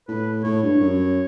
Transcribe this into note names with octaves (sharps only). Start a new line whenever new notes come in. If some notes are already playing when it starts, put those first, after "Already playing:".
A2 B4
A2 C#5
G2
F#2